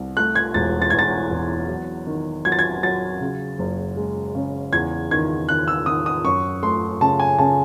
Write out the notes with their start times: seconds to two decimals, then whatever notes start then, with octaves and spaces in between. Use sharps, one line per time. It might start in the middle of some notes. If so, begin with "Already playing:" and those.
Already playing: C2
0.17 A3 F#6
0.35 G#6
0.54 E1 A6
0.82 A6
0.90 E2 G#6
0.99 A6
1.31 E2
1.69 F#3
2.07 D#3
2.45 F#3 G#6
2.52 A6
2.59 G#6
2.83 F#3 A6
3.21 C#3
3.59 F#1
3.97 G#3
4.35 C#3
4.73 E2 G#6
5.11 D#3 G#6
5.49 D#3 F#6
5.68 E6
5.86 D#3 D#6
6.06 D#6
6.24 F#2 C#6
6.63 A3 C6
7.01 C#3 A5
7.20 G#5
7.38 C#3 A5